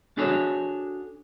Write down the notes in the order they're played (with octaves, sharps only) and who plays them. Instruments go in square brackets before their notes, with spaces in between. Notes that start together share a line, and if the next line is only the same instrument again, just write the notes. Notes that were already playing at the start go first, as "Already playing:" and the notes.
[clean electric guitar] D4 F#4 G#4 A4 C#5